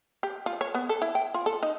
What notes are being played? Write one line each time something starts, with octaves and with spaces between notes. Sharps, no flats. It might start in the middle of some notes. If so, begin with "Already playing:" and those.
G4
F4
C#5
B3
A4
E4
G5
F4
A4
D#4